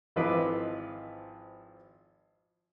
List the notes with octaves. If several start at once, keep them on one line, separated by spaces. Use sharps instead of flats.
G#1 F3 E4 B4 D#5 D6